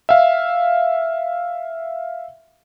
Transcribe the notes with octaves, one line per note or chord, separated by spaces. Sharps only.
E5 F5